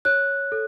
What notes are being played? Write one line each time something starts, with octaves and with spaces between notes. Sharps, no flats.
C#5 F#6
A4